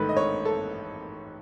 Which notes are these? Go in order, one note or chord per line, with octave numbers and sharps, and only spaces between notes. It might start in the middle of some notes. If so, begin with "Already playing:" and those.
Already playing: A1 G#2 D#3 A3 B4
D#5
C#5
A4